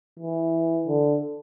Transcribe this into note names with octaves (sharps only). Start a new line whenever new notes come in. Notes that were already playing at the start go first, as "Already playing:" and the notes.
E3
D3